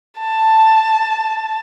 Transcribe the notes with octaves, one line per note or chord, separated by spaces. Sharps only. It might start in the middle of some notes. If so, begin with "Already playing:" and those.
A5